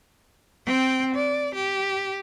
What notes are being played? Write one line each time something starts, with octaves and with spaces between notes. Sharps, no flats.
C4 G5
D5
G4